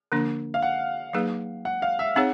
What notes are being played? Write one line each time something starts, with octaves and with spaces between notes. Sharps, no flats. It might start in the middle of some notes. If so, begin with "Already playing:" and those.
D3 F3 A#3 D4
F5
F#5
F#3 A#3 D#4 G#4 B4
F#5
F5
E5
C4 D#4 G#4 C#5 F#5